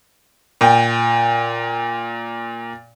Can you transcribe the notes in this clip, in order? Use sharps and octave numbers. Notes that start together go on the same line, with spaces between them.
A#2 G5